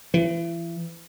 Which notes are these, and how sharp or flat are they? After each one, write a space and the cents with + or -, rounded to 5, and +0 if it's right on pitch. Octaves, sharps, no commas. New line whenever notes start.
E3 +35